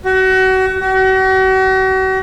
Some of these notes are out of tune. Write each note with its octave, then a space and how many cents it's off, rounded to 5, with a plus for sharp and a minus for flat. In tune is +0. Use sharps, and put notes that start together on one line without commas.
F#4 +30
F#4 +40